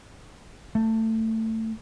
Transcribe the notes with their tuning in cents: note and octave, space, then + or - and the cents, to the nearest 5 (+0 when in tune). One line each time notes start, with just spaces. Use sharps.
A3 +20